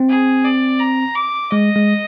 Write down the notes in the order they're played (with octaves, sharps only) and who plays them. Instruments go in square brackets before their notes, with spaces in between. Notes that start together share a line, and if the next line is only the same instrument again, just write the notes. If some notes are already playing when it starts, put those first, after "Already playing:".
Already playing: [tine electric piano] C4
[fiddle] G#4
D5
A#5
D6
[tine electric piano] G#3 [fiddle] D#5
[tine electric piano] G#3